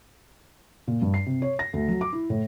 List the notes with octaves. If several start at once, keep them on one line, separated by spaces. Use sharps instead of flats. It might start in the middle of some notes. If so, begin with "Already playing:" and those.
A#2
G2
C7
C3
C#5
A#6
D2
F#3
D6
E4
A2